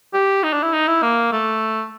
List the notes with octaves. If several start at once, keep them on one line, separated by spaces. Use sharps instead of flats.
G4
D#4
D4
E4
D#4
E4
A#3
A3